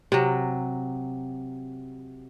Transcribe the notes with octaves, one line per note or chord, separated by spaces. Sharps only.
C3 F#3